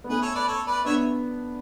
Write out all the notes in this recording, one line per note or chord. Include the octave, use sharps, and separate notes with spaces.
B3
A3 C#4 G#4 B4
A4 C#5
B4 D5
A4 C#5
B4 D5
B3 D4 C#5 E5